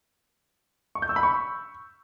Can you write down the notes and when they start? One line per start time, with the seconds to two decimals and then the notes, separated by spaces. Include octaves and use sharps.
0.95 C#6
1.02 G6
1.09 E6
1.16 B5
1.23 C#6